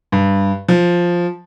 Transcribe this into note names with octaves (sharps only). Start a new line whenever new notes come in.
G2
F3